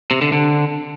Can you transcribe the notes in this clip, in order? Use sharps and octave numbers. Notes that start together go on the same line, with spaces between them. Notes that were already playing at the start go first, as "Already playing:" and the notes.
C3
D3
D3